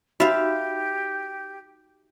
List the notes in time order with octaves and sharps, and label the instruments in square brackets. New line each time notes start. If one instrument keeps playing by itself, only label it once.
[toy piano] D#4 F#4 B5 [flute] G4 [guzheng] E5 F5